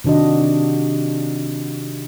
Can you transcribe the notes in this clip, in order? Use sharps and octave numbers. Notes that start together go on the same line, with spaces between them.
C3 D#3 D4 F#4 D#5